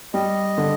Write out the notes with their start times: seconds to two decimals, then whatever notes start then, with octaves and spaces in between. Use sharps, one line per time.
0.14 G3 D#5
0.58 D3